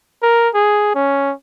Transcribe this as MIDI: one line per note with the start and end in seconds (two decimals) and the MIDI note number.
0.22 0.49 70
0.55 0.91 68
0.95 1.33 61